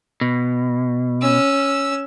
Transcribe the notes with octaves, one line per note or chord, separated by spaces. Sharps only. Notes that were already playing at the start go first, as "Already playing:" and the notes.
B2
C#4 E6